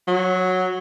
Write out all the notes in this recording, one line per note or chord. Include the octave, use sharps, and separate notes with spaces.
F#3